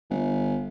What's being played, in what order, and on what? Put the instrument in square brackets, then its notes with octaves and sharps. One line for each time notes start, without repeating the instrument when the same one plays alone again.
[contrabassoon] G1